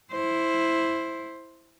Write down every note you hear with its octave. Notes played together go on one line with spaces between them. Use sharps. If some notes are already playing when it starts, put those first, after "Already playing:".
E4 C5